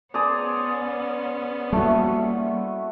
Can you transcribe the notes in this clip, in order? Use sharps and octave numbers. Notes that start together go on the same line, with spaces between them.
B3 C#4 G#4 C5 D5 A#5 D#6
G3 A3 A#3 E4 F#4